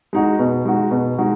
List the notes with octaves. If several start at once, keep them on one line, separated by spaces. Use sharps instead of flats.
G#3 D#4 F#4
B2
G#3 D#4 F#4
B2
G#3 D#4 F#4